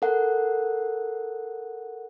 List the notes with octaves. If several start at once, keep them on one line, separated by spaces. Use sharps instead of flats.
A4 A#4 F#5